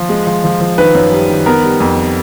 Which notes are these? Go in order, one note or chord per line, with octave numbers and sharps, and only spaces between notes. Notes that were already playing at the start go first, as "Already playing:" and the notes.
Already playing: F3
G#3
F3
F3
F3
D#3 B4
F#2
G3
D#3
B3 A#4
G3
F2